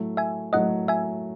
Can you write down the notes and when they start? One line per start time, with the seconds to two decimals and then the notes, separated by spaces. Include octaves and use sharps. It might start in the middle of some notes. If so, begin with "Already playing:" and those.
Already playing: A2 F#3 A3
0.17 E5 G#5
0.53 A2 F#3 A3 D#5 F#5
0.88 E5 G#5